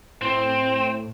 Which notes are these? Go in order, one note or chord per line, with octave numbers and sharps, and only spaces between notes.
A2 C4